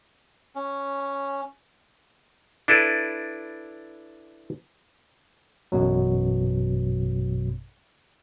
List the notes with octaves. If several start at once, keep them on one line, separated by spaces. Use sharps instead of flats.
C#4
D4 E4 A4 B4
A1 F#2 B2 F#3